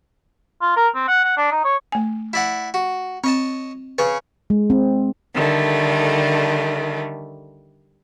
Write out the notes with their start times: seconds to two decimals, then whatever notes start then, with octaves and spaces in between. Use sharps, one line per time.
0.62 F4
0.76 A#4
0.95 C4
1.08 F#5
1.24 F#5
1.37 D4
1.51 D#4
1.65 C#5
1.92 A3 G#5
2.33 E4 D5 F#5
2.74 F#4
3.24 C4 C#5 D#5 A5
3.98 C#3 G#4 B4 C#5 C#6
4.50 G#3
4.70 C4
5.34 D3 D#3 G3 A3